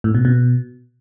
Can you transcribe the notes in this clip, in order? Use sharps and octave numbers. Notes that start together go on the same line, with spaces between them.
A2
B2
B2